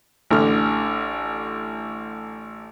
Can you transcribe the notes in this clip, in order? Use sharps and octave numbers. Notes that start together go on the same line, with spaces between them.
A1 D3 F6